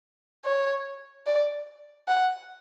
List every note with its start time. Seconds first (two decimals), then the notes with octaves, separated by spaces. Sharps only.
0.45 C#5
1.26 D5
2.08 F#5